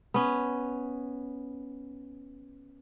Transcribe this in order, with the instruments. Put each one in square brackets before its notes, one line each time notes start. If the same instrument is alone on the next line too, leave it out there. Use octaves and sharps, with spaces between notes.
[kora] B3 C#4